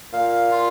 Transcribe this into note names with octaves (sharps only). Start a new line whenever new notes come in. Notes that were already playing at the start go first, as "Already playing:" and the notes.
A#2 F5
F4